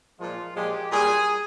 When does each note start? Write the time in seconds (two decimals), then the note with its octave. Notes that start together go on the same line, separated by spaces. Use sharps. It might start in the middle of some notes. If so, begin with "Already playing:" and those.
0.19 A#2 F3 G#3 F4
0.55 A#2 F3 G#3 G4
0.91 A#2 G3 G#4